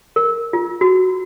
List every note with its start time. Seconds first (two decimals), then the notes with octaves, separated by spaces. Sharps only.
0.16 A#4
0.53 F4
0.81 F#4